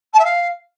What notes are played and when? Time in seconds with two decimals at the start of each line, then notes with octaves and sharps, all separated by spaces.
0.13 A5
0.19 E5
0.24 F5